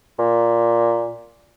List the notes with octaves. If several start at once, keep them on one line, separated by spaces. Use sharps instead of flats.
A#2